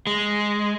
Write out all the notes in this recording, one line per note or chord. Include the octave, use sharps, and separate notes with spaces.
G#3